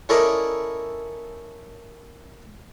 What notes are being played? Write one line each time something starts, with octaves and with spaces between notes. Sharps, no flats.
C#4 E4 A4 A#4 D5 D#5